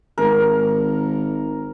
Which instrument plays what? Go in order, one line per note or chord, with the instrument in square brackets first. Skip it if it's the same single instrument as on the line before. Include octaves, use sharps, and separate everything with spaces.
[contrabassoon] G#1 [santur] A#4